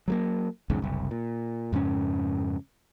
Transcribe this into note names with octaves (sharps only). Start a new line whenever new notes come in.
F#3 G#3 A#3
B1 E2 G#2 C#3
F#1 C2
A#2
F2 G#2 C#3 C#4